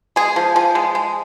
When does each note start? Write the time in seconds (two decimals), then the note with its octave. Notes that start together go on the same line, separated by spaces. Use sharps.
0.16 G#3 G#4
0.36 F3
0.56 F3
0.75 G#3
0.95 G#3